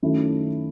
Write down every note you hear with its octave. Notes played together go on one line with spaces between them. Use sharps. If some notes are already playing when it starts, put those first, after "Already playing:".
F#2 D#3 A3 C#4 E4